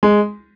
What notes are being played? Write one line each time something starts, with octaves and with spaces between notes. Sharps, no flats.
G#3